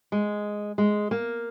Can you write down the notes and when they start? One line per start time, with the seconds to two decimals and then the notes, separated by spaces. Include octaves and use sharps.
0.12 G#3
0.78 G#3
1.11 A#3